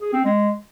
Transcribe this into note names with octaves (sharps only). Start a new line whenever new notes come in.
G#4
C4
G#3